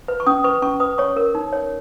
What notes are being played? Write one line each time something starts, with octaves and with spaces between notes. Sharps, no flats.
B4
C#6
C#4 D#6
B4 C#6
C#4 C#6
B4 D#6
C#5 C#6
A#4
D#4
C#5